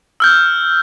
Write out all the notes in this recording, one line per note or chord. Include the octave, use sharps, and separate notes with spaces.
E6 F6 G6